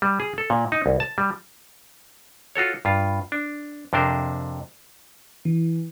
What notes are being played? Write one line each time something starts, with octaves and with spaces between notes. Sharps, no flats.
G3
G#4
A4
A#2
D#4
C2
A5
G3
F4 F#4 A4 C#5
G2 F4
D4
F2 C3 D4 A#4 C5
E3